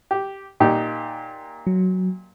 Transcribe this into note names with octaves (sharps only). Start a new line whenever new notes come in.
G4
A#2 D#4 G4
F#3